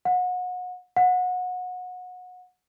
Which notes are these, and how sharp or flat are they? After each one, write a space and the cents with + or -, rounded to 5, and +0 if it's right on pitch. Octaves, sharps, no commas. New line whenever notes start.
F#5 -30
F#5 -25